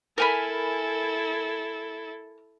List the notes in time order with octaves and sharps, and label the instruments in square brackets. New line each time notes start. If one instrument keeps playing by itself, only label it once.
[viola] E4 A4 [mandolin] A#4 G#5 B5